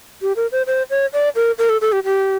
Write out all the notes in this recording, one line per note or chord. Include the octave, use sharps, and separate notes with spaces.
G4
A#4
C5
C5
C#5
D5
A#4
A#4
A4
A4
G4
G4